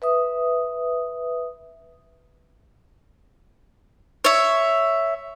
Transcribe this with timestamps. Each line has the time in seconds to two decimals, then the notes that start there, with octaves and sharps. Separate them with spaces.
0.02 B4 E5 D#6
4.24 C#5 E5